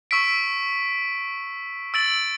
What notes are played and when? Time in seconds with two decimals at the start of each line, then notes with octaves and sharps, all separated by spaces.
0.11 C#6 E6 B6 D7
1.94 E6 A6 D7 F#7